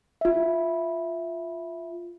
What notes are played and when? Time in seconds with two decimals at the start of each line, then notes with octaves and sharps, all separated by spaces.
0.21 F4 E5